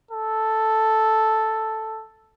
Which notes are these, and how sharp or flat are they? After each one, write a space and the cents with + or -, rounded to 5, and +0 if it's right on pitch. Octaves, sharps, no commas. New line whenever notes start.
A4 +0